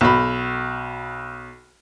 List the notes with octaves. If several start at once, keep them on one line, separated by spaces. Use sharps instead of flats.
B1 B5